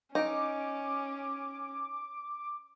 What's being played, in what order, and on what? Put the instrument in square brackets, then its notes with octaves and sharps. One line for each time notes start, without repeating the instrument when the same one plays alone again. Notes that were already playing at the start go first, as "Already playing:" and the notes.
[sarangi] C#4 [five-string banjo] D#4 [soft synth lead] D6